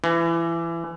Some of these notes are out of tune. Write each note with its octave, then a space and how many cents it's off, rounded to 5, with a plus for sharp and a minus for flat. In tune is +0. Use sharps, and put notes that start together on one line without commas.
E3 +25